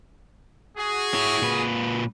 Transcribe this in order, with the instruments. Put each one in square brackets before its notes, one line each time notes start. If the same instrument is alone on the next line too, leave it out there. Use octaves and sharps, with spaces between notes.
[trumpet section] F#4 G#4
[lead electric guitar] E4 C#5
A#2 B4